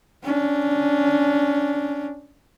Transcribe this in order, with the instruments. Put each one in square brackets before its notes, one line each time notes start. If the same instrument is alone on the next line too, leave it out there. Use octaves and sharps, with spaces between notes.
[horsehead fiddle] C#4 D4